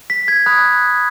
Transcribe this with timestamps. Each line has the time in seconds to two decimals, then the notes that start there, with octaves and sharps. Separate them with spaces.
0.10 B6
0.28 G#6
0.46 B5 D#6 F#6